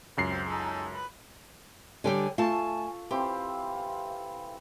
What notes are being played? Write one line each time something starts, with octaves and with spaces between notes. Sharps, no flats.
C#2 F#2 C7
C4 G4
D#4 G#4 A4
B4
D3 G3 G4 C#5 G5 G#5
A3 F4 A4 G#5 A5 C#6
E3 C4 G4 F5 C6